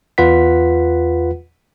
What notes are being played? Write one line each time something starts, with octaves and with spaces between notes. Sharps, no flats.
E2 F4 B4 F#5 B6